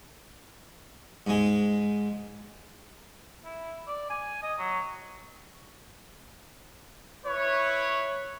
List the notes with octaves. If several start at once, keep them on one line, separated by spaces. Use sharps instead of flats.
G#2 G#3
E4
D5
G#5
D#5
F#3
E4 B4 C#5